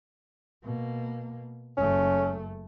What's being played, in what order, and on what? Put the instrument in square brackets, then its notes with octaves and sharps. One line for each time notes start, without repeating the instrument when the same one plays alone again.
[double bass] B2 A#3
[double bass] F#1 A3 [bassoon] C#4